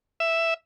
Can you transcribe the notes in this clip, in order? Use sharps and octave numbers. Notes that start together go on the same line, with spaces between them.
E5